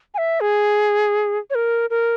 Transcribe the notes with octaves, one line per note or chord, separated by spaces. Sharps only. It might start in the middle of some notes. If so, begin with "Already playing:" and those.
G#5
E5
G#4
C#5
A#4
A#4